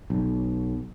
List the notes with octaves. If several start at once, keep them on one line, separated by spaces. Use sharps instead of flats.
B1